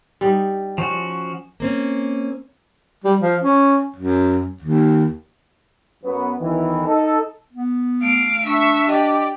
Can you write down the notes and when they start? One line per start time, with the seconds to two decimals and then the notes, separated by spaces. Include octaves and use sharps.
0.21 G3 D#4
0.78 F3 C#4 F#4
1.60 A#3 C4 C#4
3.04 G3
3.20 F3
3.42 C#4
3.96 F#2
4.62 D#2
6.04 F#2 F#3 B3
6.40 B1 D#3 E3
6.86 D#4 A4
7.53 B3
8.03 A3 F5 D7
8.45 D4 E5 C#6
8.89 G4 D5 D#5